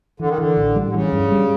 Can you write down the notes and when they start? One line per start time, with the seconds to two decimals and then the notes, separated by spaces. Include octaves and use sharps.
0.20 D3 E3
0.29 D#3
0.38 D3 E3
0.57 A1
0.76 G3
0.89 D3
0.94 C#3 E3
1.13 G2
1.31 G3